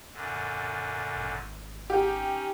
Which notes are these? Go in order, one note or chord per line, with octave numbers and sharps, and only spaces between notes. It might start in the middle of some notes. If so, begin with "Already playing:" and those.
F#2 A#2 D3
G#1
C#4 D#4 G4